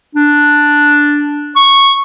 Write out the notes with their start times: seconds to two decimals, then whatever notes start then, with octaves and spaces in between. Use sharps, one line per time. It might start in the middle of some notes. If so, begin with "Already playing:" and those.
0.15 D4
1.56 C#6